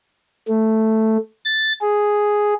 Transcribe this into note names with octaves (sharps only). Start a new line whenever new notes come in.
A3
A6
G#4